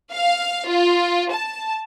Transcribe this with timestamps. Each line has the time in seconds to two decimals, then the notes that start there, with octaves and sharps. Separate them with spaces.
0.11 F5
0.68 F4
1.31 A5